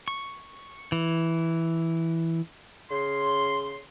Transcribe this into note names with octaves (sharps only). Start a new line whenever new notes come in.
C#6
E3
C#3 C6